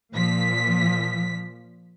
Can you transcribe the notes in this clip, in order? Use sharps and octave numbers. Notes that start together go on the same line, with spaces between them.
A#2 F3 B6